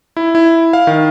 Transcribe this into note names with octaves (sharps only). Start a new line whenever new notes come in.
E4
E4
F5
D#3